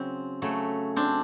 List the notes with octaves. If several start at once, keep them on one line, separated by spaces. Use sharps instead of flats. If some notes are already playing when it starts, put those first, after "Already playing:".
Already playing: C#3 F#3 C4
C#3 F#3 A3
C4 D4